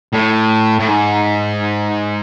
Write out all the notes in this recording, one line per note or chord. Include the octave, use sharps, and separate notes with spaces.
A2
A2
G#2